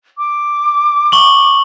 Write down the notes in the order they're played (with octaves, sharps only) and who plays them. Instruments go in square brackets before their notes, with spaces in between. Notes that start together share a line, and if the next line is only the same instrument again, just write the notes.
[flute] D6
[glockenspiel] C#6 F#7